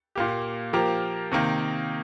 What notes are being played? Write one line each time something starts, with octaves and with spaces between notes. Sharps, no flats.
A#2 A#3 G4
F3 A#3 G4 A#4
C3 D#3 A#3